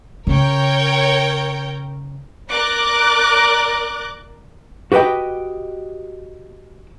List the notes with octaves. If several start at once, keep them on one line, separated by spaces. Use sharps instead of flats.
C#3 A#4 C#5 G5
A#4 D5 D6 F#6
F#4 G4 B4 D#5 G5